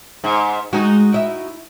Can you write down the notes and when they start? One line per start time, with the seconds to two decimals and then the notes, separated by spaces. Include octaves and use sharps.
0.24 G#2
0.73 G#3 D#4 F#4
1.13 E4 D#5 E5